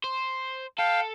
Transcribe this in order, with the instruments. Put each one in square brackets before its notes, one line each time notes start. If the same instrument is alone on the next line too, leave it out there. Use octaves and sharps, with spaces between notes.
[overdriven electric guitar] C5
[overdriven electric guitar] A4 [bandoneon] F5 G5